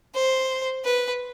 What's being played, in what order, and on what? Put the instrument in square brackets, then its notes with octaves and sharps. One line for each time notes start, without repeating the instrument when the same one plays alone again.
[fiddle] C5
B4